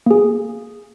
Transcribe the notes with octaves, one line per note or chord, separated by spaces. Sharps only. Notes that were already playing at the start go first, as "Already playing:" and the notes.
A#3 G#4